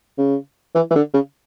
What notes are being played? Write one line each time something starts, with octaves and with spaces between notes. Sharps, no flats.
C#3
E3
E3
D3
C#3